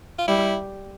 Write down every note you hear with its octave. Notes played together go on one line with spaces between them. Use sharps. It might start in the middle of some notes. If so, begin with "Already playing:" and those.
F4
G3 E4